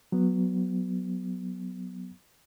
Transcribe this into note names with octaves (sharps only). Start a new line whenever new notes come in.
F#3 B3